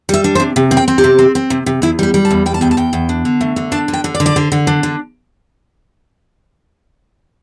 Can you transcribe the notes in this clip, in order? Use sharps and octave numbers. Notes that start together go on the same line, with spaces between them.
G3 E5
D4
C5
C3
C3
C4
G5
C4
G4
C3
C4
C4
C3
C3
E2 E4
G3 G4
G3
A5
E2
G3 G5
A5
E2 G5
A5
E2 G5
E2
D4
D3
A3
D3
D4 A5
D3
G5
D3
D5
D3
D5
D3 C5
D3
D4
D3